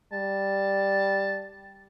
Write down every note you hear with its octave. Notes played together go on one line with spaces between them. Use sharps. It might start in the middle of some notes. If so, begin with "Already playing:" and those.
G3 A5